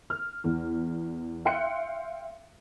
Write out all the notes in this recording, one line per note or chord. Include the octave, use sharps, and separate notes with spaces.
F6
E2
E5 F5 G5 C6 F#6 C#7